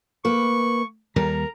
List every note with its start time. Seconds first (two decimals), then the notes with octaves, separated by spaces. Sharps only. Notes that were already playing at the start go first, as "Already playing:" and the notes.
0.25 A#3 B4 C#6
1.16 D#2 G3 A#4 A#5